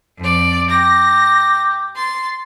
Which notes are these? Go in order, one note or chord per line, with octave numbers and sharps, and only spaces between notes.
F2 D5
G4 A#6
C6 A6